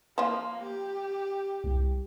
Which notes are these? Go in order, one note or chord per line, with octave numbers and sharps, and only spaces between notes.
F3 A#3 F4
G4
C2